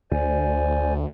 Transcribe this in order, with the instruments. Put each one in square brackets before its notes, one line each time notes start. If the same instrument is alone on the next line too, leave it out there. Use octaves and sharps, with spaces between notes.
[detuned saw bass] D2 [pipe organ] C5 D5 G#5